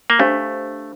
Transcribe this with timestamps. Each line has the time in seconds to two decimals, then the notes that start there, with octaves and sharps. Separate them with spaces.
0.10 A#3
0.19 A3 D4 G4 C5 F5